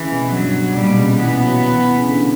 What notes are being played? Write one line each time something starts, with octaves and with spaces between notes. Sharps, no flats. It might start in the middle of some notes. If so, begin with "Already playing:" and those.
Already playing: C#3 E3
B2
G2 F#3
A#2 G3
B2
C#3
C#3
E3 B3
F#3
E3
E3
C#3
D3